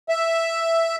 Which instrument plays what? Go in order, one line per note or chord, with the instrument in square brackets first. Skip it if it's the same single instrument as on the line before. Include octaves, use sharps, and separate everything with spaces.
[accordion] E5